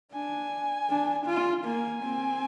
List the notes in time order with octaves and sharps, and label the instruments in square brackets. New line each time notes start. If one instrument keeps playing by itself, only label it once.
[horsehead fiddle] D4 [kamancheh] G#5
[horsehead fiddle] D4
F4
[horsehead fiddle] A#3 [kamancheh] G#5
[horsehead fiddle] C4